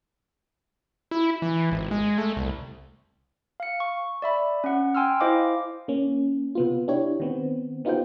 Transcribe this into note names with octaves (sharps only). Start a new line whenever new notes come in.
E4
E3
G#1
G#3
A3
C2
F5 C#7
C#6
D5 E5 B5
C#4 F#5
G5 G#5 C6 E6 F6
E4 C5 D#5 F5 D6
A#3 C#4
C3 B3 F4
D4 E4 G4 C#5
D#3 B3 C4
B3 D#4 F4 G4 C5 G5